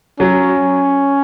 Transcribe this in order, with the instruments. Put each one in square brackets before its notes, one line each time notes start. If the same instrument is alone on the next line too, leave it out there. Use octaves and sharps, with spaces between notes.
[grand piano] F#3 [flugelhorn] C#4